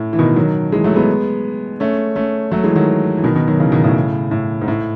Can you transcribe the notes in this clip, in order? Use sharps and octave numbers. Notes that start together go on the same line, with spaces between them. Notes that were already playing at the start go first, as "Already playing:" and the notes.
Already playing: A2
E3
B2 D#3
D#3 F#3
E3 G#3
F#3 A3
G#3 B3
A3 C#4
A3 C#4
F#3 A3
E3 G#3
D#3 F#3
E3
B2 D#3
B2 D#3
D#3 F#3
C#3 E3
B2 D#3
A2 C#3
A2
G#2
A2